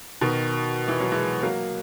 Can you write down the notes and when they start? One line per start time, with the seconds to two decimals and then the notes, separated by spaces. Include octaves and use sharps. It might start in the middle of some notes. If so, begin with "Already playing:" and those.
0.21 B2 D#3
0.88 E3
1.00 F#3
1.12 E3 G#3
1.42 F#3 A#3